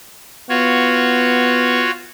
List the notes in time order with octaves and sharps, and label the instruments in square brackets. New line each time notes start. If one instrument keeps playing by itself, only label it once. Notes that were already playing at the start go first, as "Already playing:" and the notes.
[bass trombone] B3 [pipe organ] F4 F#4 C#5